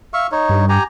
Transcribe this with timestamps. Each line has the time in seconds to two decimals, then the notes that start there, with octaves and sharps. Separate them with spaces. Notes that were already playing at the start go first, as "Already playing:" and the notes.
0.13 E5 F5 C#6
0.32 D#4 C#5
0.49 G2
0.69 G4 G#5 A#5